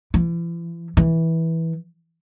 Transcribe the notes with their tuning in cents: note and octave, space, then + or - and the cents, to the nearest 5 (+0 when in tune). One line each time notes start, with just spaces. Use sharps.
E3 +40
E3 -15